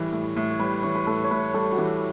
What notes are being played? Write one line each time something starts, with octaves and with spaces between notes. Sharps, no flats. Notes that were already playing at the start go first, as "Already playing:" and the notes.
Already playing: A2 E3 G3 B4 C#5
A2
A2
C#5
G3 B4
E3 C#5
B4
A2 A4
C#5
A2 B4
G3 A4
F#4
E3 G4